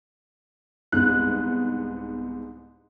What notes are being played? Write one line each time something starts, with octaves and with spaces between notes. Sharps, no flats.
C2 G#2 B3 F#6